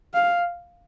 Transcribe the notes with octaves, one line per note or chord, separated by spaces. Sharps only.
F5